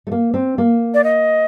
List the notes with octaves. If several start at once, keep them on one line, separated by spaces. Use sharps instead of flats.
A3
A#3
C4
A#3
D5
D#5